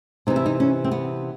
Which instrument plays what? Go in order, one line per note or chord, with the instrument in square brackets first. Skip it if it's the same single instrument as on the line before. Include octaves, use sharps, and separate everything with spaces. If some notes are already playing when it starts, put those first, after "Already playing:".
[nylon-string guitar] C3 E3 D#4
E4
D#4
C#4
C4
B3